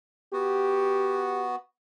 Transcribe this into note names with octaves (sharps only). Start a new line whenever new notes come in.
B3 F#4 G4